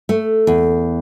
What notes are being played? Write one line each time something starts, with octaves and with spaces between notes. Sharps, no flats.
A3
E2